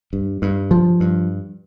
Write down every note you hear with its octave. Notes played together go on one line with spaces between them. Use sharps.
G2
G2
F3
G2